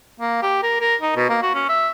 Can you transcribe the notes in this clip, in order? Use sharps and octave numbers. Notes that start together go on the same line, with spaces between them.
A#3
G4
A#4
A#4
D#4
B2
A#3
F#4
C#4
E5